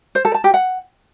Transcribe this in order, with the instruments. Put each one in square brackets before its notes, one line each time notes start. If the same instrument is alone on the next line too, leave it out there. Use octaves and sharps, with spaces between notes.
[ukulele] C5
A4
A5
G4
F#5